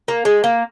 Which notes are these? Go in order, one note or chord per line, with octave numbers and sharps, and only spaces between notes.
A#3
G#3
A#3